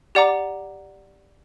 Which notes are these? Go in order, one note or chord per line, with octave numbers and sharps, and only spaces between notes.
G4 D5 F#5 A#5 D6